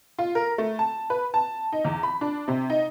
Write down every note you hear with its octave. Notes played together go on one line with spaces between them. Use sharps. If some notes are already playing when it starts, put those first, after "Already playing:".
F4
A#4
A3
A5
B4
A5
D#4
E2
B5
D4
C3
D#4